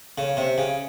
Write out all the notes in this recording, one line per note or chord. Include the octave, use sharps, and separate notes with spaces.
C#3
C3
C#3